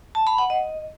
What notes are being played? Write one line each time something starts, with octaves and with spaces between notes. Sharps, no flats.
A5
B5
F#5
D#5